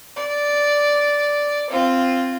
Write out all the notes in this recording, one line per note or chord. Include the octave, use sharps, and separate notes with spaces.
D5
C4 F4